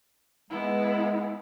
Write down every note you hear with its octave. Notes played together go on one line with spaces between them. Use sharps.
G#3 B3 E4